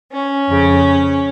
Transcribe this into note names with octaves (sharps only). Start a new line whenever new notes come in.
C#4
F2 C#3